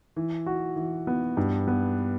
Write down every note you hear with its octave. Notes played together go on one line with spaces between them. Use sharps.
E3
F#4
E3
B3
G2
B3